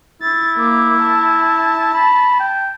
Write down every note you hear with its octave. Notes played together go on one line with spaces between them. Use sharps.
E4 A6
A#3 D6
A5
B5
G5